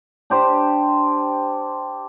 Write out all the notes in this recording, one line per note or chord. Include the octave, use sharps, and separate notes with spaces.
D4 G4 C5